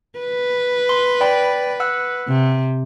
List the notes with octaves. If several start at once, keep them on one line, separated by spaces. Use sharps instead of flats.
B4
C6
D5 G5 B5
F#5 E6 F#6
C3